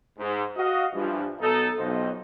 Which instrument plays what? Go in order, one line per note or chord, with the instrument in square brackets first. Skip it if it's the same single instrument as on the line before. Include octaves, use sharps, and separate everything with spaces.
[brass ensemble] G#2
F#4 D#5 F5
G2 E3 F3
B1 D#4 A4
B1 F2 C5 D#5